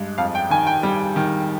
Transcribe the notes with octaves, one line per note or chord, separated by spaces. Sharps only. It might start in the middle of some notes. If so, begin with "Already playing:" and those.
Already playing: G2 G#3
F2 F5
G5
D#3 G#5
G5
G3
D#3